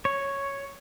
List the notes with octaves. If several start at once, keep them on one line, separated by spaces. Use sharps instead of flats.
C#5